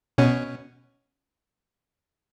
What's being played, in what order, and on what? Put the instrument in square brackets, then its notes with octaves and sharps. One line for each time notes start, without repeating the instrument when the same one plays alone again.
[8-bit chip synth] B2 C#4